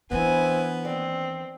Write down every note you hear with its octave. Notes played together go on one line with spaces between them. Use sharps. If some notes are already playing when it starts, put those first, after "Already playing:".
E3 B3 C4 D4 E4 B4 G#5
D#2 A#2 C4 D5